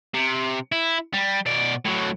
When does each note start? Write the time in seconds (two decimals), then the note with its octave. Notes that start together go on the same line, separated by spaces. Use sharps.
0.14 C3
0.72 E4
1.13 G3
1.46 B2 D5
1.85 A2 F#3